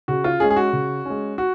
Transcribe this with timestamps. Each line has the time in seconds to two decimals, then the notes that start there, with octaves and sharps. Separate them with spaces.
0.08 C#3 F#4
0.24 F4
0.40 G#3 C#4 G#4
0.50 G#4
0.56 F#4
0.73 C#3
1.05 G#3 C#4
1.38 F#4